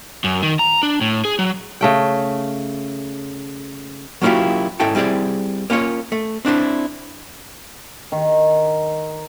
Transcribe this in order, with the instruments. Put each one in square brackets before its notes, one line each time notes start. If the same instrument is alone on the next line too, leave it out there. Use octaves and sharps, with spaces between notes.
[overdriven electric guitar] F#2
D#3
A#5
D4
A2
G#4
F#3
[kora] C#3 A3 G5
[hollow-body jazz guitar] F#3 A#3 C#4 E4 F4 G4
G#2 C#4 E4 A4 G5 A5
G3 C4 E4 G#4 D5
A#3 C#4 F4 C#5
A3
C4 D4 E4 C5
[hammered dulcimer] D#3